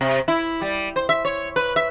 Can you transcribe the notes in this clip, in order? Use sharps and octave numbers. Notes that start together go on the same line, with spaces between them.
C3
E4
G3
C5
E5
C#5
B4
E5